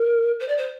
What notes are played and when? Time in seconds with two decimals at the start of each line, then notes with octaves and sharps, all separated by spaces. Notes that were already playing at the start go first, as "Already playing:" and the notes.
Already playing: A#4
0.39 C5
0.48 D5
0.57 C5